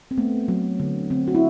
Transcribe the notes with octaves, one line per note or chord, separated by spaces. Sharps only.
C4
A3 B3
F#3
D3
D3 C4
F#4
E4